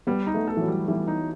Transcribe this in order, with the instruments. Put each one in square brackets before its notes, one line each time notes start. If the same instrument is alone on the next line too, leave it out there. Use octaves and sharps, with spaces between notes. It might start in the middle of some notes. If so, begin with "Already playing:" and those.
[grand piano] G3 [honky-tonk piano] B3
[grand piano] D#4
[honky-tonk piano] A3
[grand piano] A4
[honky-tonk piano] E3
F#3
[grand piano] G3
[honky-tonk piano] E3 [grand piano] G3
[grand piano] D#4